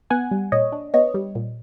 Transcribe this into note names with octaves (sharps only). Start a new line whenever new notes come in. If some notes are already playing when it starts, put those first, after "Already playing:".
B3 F#5 G#5
G3
A#2 C#5 D#5
D4
B3 C#5 D#5
G3
A#2